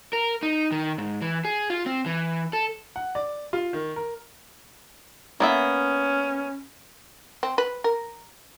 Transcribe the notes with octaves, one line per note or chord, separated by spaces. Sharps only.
A#4
D#4
D#3
G#2
E3
G#4
F4
C4
E3
A4
F#5
D5
F4
D#3
A#4
A#3 B3 C#4 E5
C4
B4
A#4